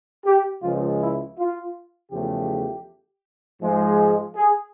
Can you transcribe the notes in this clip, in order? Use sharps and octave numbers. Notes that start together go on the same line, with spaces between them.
G4
C#2 C#3 F3 G#3 F4
E4
F4
E2 C#3 F3 A3 G4
G#2 F3 G#3
G#4